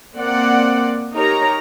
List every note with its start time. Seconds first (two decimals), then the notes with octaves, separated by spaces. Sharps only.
0.16 A#3 C4 D5 F#5
1.13 D#4 G4 A#4 C#5 A#5